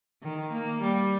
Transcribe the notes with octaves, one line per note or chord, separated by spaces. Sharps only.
D#3
A#3
G3